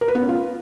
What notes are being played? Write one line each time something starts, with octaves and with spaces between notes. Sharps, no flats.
A#4
B4
B3
C#4
F4